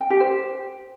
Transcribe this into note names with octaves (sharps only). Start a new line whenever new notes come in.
G5
G4
C5